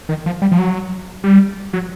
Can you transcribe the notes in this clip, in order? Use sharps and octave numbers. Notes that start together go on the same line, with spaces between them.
D#3
F3
G3
F3
F#3
G3
F#3